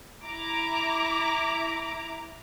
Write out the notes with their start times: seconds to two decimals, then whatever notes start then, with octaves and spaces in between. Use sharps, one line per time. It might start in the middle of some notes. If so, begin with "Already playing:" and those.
0.24 E4 A#5 D6